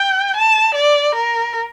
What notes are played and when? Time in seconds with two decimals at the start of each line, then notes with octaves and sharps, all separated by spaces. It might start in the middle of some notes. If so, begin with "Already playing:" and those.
Already playing: G5
0.36 A5
0.75 D5
1.15 A#4